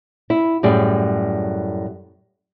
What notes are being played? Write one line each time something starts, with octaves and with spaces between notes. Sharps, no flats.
E4
F#2 A2 G3 G#4